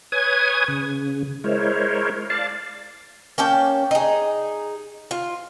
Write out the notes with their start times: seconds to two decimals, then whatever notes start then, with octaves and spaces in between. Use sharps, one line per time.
0.12 B4 C#5 G#5 D#6 G#6
0.68 C#3
1.44 G#3 E4 A#4 C5 C#5
2.30 D5 F5 A5
3.38 A#3 C#4 G5 A5
3.91 D#4 G#4
5.11 F4